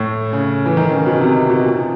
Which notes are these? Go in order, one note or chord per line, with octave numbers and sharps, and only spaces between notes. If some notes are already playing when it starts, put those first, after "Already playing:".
Already playing: A2
C#3
E3
D#3
C#3
B2
C3
B2
A#2